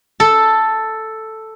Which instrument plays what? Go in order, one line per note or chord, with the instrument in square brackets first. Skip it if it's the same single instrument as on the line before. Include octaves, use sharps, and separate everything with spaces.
[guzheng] A4